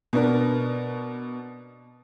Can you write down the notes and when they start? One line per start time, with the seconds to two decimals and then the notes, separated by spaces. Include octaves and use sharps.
0.13 B2 B3 D4 A#4